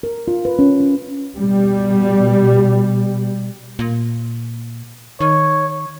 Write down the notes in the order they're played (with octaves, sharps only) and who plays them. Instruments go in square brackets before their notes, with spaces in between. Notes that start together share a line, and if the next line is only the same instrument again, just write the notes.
[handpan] A#4
F4
B4
C#4
F4
[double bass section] B2 G3
[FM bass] A#2
[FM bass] D#3 [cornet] C#5